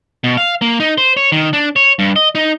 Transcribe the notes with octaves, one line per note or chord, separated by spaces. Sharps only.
B2
F5
A#3
D#4
C5
C#5
D#3
D4
C#5
G2
D#5
D#4